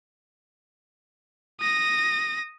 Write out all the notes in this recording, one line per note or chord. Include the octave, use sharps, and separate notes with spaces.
D#6 A#6